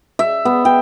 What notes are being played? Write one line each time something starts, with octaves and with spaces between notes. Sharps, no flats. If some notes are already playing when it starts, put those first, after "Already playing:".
E5
B3
G5